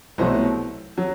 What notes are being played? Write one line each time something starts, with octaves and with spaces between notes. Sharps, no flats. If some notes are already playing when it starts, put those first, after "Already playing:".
C2 B2 F#3 A3 C5
F#3